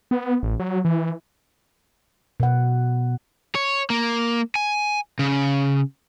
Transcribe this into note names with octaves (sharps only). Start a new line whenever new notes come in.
B3
A1
F#3
E3
B2 F#5
C#5
A#3
G#5
C#3